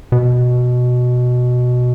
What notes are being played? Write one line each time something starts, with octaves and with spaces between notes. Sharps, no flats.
B2